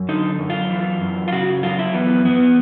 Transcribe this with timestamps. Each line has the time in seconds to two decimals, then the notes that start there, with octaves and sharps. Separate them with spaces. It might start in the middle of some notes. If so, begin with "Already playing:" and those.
Already playing: F#2
0.09 D3 D#4
0.39 F#2
0.50 F4
0.70 E3
1.01 F#2
1.28 F4
1.33 C#3 F#4
1.63 F#2 F4
1.79 E4
1.94 E3 B3
2.24 E2 B3